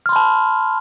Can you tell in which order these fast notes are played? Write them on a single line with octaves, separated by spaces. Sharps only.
F6 C6 B5 A5